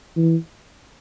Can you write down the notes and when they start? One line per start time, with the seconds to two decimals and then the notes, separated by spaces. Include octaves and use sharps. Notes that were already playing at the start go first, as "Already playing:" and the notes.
0.17 E3